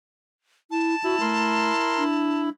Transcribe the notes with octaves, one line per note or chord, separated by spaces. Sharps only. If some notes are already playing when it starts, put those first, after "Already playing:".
E4 A5
E4 F#4
A3 A#4 C6
D4